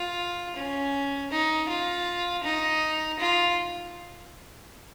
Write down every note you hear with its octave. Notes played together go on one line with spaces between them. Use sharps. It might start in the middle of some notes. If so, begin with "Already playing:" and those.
Already playing: F4
C#4
D#4
F4
D#4
F4